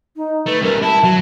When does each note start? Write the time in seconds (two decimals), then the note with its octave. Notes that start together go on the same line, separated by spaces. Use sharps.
0.16 D#4
0.47 A3 B4
0.63 G3 C#4 A#4
0.82 E4 A5
1.04 F#3